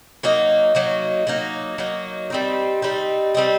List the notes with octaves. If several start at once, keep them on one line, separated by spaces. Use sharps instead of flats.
F#3 A#3 D#4
F#3 A#3 D#4
F#3 A#3 D#4
F#3 A#3 D#4
G3 C4 D#4
G3 C4 D#4
G3 C4 D#4